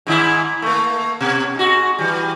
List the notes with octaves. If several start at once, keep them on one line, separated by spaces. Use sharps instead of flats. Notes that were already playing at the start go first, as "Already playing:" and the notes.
G#2 D#3 E4
A3 A#3
B2
G#2 F#4
E3 G3